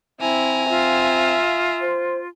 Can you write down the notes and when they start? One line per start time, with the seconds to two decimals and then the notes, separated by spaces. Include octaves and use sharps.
0.21 C4 E4 G#5 A#5
0.69 F4 E5 F5
1.82 C5